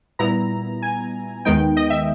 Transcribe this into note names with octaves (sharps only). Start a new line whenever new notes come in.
A#2 G3 B3 E4 A#5
G#5
D#2 D#3 G#3 B3 D#4 G5
D#5
E5